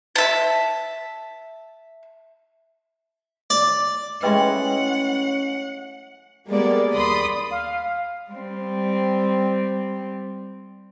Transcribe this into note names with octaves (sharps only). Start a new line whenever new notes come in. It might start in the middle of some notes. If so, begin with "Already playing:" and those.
E5 A5
D5
G#3 A3 C#4 E4 B4 D#5 F#5 G5
G3 G#3 A#3 B3 A#4 D5
D#2 D5 B5 C6 D#6
F5
G3 C4